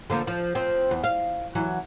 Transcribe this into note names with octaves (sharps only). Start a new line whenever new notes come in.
D3 F3 A#3
F3
F3 C4
E2
F5
E3 F#3